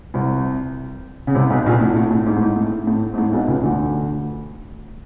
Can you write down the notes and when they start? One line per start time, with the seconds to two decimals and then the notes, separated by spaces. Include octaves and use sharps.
0.14 C2 C3
1.27 C#3
1.35 C2 C3
1.50 B1 B2
1.66 A#1 A#2
1.81 A2
1.96 A2
2.11 A2
2.26 G#2
2.37 A2
2.42 G#2
2.56 A2
2.87 A2
3.14 G#2
3.18 A2
3.33 B1 B2
3.48 C#2 C#3
3.63 D2 D3